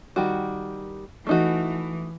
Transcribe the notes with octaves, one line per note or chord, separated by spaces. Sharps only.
D#3 G3 F#4
E3 A3 D#4 F#4